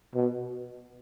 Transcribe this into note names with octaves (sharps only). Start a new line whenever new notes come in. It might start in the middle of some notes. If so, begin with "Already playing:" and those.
B2